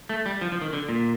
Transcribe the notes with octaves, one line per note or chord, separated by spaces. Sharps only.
A3
G3
F3
F3
D#3
D3
A#2